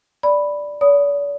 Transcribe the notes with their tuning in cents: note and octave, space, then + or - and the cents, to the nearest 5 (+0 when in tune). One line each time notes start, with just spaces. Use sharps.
D5 +0 B5 +0
D5 -45 B5 +0 D#6 +0